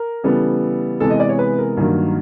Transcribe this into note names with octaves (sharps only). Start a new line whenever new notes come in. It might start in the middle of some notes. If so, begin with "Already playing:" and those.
Already playing: A#4
C#3 E3 G3 B3 A4
C3 E3 G#3 B3 A4
D#5
D5
C#5
B4
A#4
G2 D#3 F#3 A#3